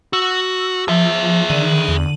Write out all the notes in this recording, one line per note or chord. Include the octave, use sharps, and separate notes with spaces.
F#4 E6
F3 G#4 E5
D3 D#3 D#7 F#7
E2